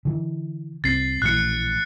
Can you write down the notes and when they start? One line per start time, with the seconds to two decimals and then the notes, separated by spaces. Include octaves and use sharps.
0.05 D3 E3
0.84 C2 C4 A6 C7
1.22 A#1 A2 E3 F#6 C#7